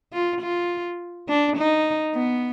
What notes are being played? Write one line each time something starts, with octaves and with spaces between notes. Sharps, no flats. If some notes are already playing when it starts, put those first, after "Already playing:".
F4
F4
D4
D#4
B3